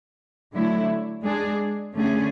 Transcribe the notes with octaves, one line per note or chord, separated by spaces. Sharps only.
D3 F#3 A3 E4
G#3 D4 G#4
D3 A3 C#4 G#4